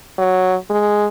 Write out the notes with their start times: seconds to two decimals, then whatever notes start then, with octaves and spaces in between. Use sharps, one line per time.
0.18 F#3
0.70 G#3